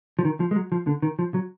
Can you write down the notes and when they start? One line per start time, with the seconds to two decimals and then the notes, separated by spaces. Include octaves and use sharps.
0.19 F3
0.25 D#3
0.40 F3
0.51 G#3
0.56 F#3
0.72 F3
0.87 D3
1.03 D#3
1.19 F3
1.34 F#3